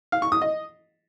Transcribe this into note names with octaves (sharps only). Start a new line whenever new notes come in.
F5
C#6
D#6
D#5